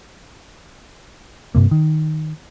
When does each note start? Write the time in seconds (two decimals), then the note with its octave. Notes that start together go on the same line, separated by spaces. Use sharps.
1.55 G2 C3 A#3
1.71 D#3